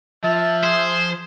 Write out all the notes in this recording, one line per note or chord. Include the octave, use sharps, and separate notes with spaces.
F3 E5 A5
G#4 C5